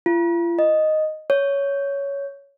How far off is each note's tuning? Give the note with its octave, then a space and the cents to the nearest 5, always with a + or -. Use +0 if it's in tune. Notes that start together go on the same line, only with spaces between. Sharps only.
F4 -40
D#5 -5
C#5 +10